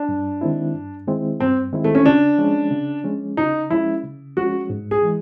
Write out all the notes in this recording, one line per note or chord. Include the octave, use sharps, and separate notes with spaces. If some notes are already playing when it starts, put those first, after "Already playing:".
Already playing: D4
G2
D#3 G#3 C4 E4
G2
D#3 G#3 C4 E4
G2 C4
D#3 G#3 C4 E4
A3
C#4
C#3 D4
F3 G#3 C#4
C#3
F3 G#3 C#4
C#3 D#4
F3 G#3 C#4 E4
C#3
F3 G#3 C#4 F#4
G#2
G#4
E3 G#3